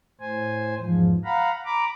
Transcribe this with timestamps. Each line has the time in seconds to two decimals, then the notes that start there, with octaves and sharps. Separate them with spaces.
0.21 A2 C5 G#5
0.81 E2 G#2 F3
1.24 F5 F#5 A#5 B5
1.65 A#5 B5 D6